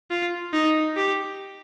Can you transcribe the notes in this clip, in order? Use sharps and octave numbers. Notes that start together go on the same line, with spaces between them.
F4
D#4
G4